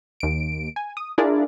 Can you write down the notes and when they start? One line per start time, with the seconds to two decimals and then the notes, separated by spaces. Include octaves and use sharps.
0.20 D#2 D7
0.76 G#5
0.97 D#6
1.18 D4 E4 F4 G#4 A#4 D5